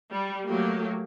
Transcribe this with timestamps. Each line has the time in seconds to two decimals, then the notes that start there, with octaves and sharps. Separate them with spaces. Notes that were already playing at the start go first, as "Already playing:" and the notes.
0.12 G3
0.46 F#3 A3 A#3 G4